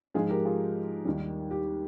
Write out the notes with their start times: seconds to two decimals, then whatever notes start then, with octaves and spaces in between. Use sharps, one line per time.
0.14 G#2 F3 G#3 F4 G#4
0.30 G4 A#4
0.45 F4 G#4
1.05 D#2 D#3 G3
1.51 G4